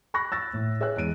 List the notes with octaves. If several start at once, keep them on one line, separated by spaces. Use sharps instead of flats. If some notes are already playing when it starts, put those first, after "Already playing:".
B5 C#6 F#6 A#6
E6 A6 A#6
A2
G#4 C#5 E6 F#6
E2 G#3 D7 D#7